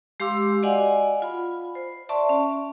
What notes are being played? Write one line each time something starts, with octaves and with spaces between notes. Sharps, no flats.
G#3 G4 F5 C6 D6 E6
F#4 D5 D#5 F5 F#5 G#5
F4 B5
C5
D5 E5 A5 C6 C#6
C#4